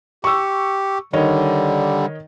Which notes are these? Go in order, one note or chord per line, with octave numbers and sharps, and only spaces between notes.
G4 C#6 E6
D3 D#3 G3 C#5 D#5